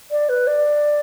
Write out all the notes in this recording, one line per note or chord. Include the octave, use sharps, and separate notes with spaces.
D5
B4
D5